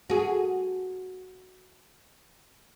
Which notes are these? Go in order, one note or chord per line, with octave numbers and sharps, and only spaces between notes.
F#4 G#4